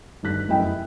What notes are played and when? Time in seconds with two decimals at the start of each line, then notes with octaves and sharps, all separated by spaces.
0.23 G1 D#3 G3 F#6 B6
0.48 F1 F#2 B3 E4 D#5 G5
0.63 E4